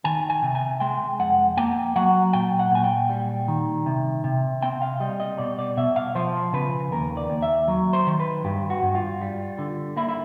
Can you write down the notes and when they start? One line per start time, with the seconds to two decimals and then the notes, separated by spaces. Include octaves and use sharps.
0.04 D#3 G#5
0.30 G#5
0.43 C3
0.55 G#5
0.80 G#3 G5
1.19 F2 F#5
1.57 A#3 G5
1.96 F#3 F#5
2.33 A#2 G5
2.59 F#5
2.71 A#2 G#5
2.84 G5
3.09 G3
3.48 D#3
3.86 C3
4.24 C3
4.62 C4 G5
4.82 F5
5.00 G3 D#5
5.20 D#5
5.38 B2 D5
5.59 D5
5.77 B2 E5
5.96 F5
6.15 F3 C5
6.53 C#3 B4
6.92 D#2 A#4
7.17 D5
7.30 D#2
7.42 E5
7.68 F#3
7.93 C5
8.07 D#3
8.20 B4
8.45 G2 G4
8.70 F#4
8.83 G2
8.95 F4
9.21 G3
9.58 D3
9.97 A#3 E4
10.09 E4